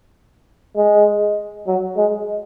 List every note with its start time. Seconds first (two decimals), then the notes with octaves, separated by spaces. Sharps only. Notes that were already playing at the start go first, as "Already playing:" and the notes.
0.77 G#3
1.67 F#3
1.97 G#3